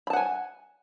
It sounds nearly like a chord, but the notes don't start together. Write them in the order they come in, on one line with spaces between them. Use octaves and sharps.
B5 A5 F#5 G#5